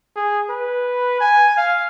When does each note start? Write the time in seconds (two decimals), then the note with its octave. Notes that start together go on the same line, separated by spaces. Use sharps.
0.16 G#4
0.50 B4
1.21 G#5
1.57 F5